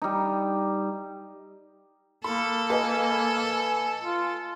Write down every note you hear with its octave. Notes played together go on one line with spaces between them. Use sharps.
G3 D#4
A#3 A4 B5
B4 D#5 G#5
F4